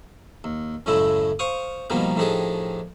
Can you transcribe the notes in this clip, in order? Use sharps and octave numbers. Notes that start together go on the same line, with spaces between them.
D#2
F#2 A2 C#3 G#3 A3 E4
C5 F5 C#6 D#6
B2 D#3 F3 G3 A#3 B3
A2 D#3 F3 D4 G4 G#4